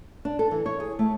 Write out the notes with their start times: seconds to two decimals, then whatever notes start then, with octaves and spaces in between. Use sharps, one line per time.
0.25 D4
0.39 A4
0.51 E3
0.66 C#5
0.80 G#4
0.99 A3